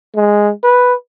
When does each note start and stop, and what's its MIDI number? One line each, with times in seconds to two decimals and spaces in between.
0.16 0.51 56
0.64 0.94 71